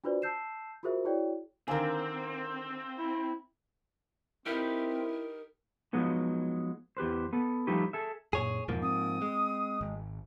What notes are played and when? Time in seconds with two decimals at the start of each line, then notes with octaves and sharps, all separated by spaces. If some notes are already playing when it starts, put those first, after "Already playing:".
0.04 D4 F4 F#4 B4 C5 D5
0.22 A5 E6 G6 C7 E7
0.83 F4 F#4 G#4 A#4 C5 E5
1.05 E4 F#4 G#4 C#5 D5 G5
1.68 D3 D#3 C4 A#4 F5 G#5
2.98 E4
4.46 C4 D#4 E4 G4 A#4 B4
5.93 F3 F#3 G#3 B3 D#4
6.97 E2 G4 B4 C5
7.33 B3 A4
7.67 F3 G3 A3 D#4 G4 B4
7.93 G#4 A4 E5
8.33 F#2 A#2 G#4 C#5
8.69 E2 G#2 B2 F3 A#3
8.83 C4 D#6
9.22 G#3
9.81 G#1